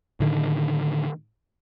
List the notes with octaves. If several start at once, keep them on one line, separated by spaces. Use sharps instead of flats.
A2 D3 D#3